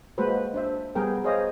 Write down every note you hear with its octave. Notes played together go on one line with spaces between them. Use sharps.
G#3 A#3 F#4 B4 C5
D4 C5 E5
G3 B3 G#4 A#4 G5
G#4 C5 C#5 D#5 F5